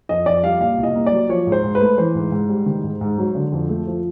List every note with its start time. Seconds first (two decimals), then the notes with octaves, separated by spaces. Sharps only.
0.09 F2 D#5
0.26 F2 D5
0.44 G3 F5
0.61 A#2 F5
0.78 C2
0.83 D#5
0.95 A#3
1.06 D5
1.12 F#3
1.29 F3 C#5
1.47 G#2
1.52 C5
1.64 G#2
1.75 B4
1.81 A3
1.98 E3 C5
2.15 G#2
2.32 G#2
2.49 G3
2.66 D#3
2.84 G#2
3.01 G#2
3.18 F#3
3.35 D3
3.52 F2
3.69 A3
3.87 F3